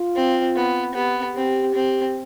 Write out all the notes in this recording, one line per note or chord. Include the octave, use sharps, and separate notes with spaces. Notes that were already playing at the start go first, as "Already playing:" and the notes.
Already playing: F4
C4
B3
B3 G4
C4 G4
C4